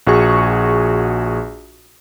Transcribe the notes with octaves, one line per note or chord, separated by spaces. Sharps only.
A#1 F#4 G#4 C#6